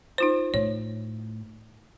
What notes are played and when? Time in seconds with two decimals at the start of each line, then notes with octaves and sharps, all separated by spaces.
0.18 D#4 F4 C5
0.54 A2 C#5